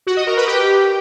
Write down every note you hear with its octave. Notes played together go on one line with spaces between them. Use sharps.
F#4
D#5
A#4
B4
G4